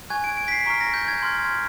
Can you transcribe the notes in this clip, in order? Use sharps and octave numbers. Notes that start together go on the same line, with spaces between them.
G#5 C#6 F#6 G#6
D7
D7
B6
C7
A#5 C#6 F6 B6
A#6
G6
G#6
C6 F6